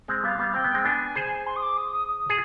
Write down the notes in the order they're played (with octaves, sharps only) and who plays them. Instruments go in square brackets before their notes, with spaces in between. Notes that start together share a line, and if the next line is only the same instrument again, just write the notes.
[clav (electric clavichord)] G#3 C4
[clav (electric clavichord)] G3 B3 [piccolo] F5
[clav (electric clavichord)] G3 B3
[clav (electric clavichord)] C4 [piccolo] G5
[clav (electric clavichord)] B3
G#3 C4
[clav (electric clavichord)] B3 D4 [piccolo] G#5
[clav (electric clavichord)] G#4 C5
[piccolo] C6
D#6
D6
D#6
D#6
D#6
[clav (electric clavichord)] G#4